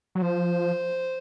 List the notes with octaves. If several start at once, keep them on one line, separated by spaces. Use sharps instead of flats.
F#3
F3 C5